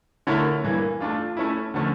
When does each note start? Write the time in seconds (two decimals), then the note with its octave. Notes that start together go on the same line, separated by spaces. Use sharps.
0.27 D3 A3 E4 A#4 C#5
0.64 G2 E3 A#3
1.00 A3 D4 F4
1.37 A3 C#4 E4
1.74 D3 F3 A3 C#4